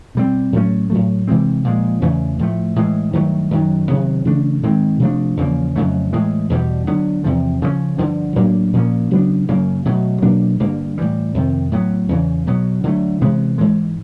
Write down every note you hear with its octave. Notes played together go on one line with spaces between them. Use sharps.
B2 G3 C4
A2 F#3 A3 C#4
A2 F#3 A3
C3 E3 G#3 C4
A#2 F3 G#3
E2 C#3 E3 A3
A2 F3 A3
A2 E3 G#3
G2 D#3 F#3 A3
F#2 D#3 F#3
C3 D#3 F#3 B3
C#3 E3 A3 D4
G#2 D#3 G#3 C4
C3 F3 A3 D4
E2 C#3 F3 A#3
F2 C#3 F#3 A3
A2 E3 G#3
E2 B2 G3
D3 F#3 B3
E2 C3 F3
C#3 F3 G#3 C#4
G2 D3 F3
A2 F#3 A#3 D4
A#2 F3 A#3 C#4
C#3 F#3 B3 D4
F#2 C#3 F#3 A#3
B2 F#3 A3
B2 F#3 A#3 D4
G2 D3 G3 A#3
A2 E3 G3
F2 C3 D#3
A2 F#3 B3
E2 C#3 E3
B2 F#3 B3
D3 F#3 A3
C3 E3 G#3 B3
G#2 E3 G#3